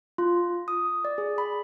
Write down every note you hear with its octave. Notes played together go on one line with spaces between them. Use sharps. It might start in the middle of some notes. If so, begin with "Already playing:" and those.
F4
D#6
D5
G#4
B5